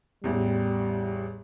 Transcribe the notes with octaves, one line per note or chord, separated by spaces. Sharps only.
A1 E2 G3